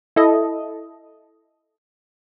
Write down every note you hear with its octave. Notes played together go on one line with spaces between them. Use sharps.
E4 A4 D#5